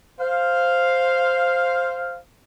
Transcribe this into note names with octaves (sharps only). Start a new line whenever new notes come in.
C5 F5